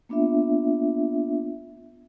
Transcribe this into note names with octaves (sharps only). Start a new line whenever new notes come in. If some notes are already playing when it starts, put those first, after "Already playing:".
A#3 B3 D4 F4 E5